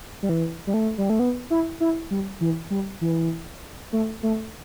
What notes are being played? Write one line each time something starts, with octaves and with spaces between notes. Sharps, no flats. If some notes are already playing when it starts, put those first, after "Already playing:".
G3
E3
G3
A3
G3
A3
B3
E4
E4
G3
E3
G3
E3
A3
A3